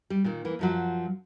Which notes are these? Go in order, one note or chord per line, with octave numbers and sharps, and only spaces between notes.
G3
A#2 D#3
E3 A#3
F#2 F3 F#3